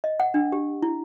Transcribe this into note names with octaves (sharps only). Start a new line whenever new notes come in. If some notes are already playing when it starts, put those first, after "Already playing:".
D#5
F#5
D4
G4
E4